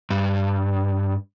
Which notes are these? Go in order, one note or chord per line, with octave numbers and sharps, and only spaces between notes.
G2